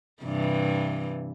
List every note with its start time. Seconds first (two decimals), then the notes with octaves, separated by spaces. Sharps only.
0.23 G2 C3 E3